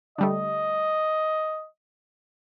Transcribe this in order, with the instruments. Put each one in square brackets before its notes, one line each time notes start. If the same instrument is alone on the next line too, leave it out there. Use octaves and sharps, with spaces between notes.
[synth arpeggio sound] D3 G3 A3 [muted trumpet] D#5